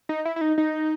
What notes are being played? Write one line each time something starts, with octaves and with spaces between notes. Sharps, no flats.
D#4
E4
E4
D#4
D#4